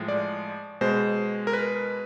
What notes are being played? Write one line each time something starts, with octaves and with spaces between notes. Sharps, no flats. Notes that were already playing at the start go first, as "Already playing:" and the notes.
Already playing: A2 F3 G#3
D5
B2 G#3 C5
A#4
B4